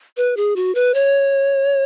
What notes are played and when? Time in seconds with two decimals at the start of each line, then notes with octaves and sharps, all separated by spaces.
0.17 B4
0.37 G#4
0.56 F#4
0.75 B4
0.94 C#5